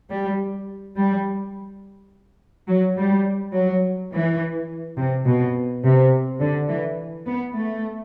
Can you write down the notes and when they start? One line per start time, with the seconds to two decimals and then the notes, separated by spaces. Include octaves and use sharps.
0.10 G3
0.96 G3
2.67 F#3
2.96 G3
3.53 F#3
4.12 E3
4.97 C3
5.26 B2
5.83 C3
6.40 D3
6.69 E3
7.26 B3
7.55 A3